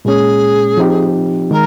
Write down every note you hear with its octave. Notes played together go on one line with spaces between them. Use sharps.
A#2 G#3 C#4 G#4
F3 C4 D#4 G4
D#3 G#3 A#4